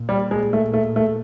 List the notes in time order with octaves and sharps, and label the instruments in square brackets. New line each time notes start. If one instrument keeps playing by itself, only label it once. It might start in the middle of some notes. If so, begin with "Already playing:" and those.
Already playing: [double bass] A#2
[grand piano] G3
G#3
A3
A3
A3